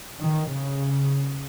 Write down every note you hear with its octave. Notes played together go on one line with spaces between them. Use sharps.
D#3
C#3